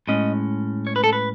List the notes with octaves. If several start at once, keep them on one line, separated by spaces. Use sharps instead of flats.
A2 G#3 C#4 D#5
C#5
B4
A4
B4